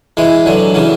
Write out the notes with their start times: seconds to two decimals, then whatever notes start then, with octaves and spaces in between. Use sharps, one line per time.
0.17 E3 G#3
0.46 D3 F#3
0.74 C#3 E3